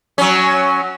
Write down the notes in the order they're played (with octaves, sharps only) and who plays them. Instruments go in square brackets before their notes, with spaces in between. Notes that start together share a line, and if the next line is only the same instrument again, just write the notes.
[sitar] F#3 C#4